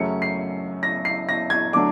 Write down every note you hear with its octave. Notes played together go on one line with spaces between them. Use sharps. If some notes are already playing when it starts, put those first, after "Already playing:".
Already playing: F#2 C#3 F#3 A3 C#4 C#7
C7
A#6
C7
A#6
G#6
D3 F#3 A3 D4 D6